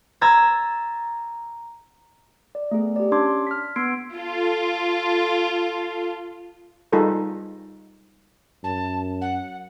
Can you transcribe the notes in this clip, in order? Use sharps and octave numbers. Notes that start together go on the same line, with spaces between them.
A#5 E6 G#6 A6
D5
A3 B3 G#4
G4 D5
C#4 D4 G4 C6 D6 G#6
F6 B6
B3 C6 E6 G#6 C7 D7
F4 A4
G3 D#4 F4 G#4 A4 B4
F#2 A5
F#5